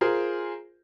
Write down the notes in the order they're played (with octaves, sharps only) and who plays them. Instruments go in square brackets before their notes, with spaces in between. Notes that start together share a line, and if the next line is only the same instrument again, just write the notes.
[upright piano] F4 G#4 A#4 C5